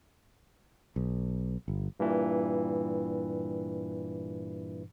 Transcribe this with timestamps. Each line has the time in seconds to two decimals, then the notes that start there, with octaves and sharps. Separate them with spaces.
0.96 B1
1.68 G1
2.00 G2 A#2 E3